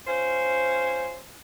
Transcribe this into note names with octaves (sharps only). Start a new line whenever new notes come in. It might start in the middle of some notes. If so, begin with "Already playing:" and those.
C#4 F4 C5